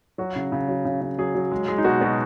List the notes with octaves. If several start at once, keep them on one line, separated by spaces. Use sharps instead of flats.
F#3 F#4
C#3
C#3
F#3
C#3
C#3
F#3 G#4
F#3
G#3
G#3
D#4
B2 F#4
B2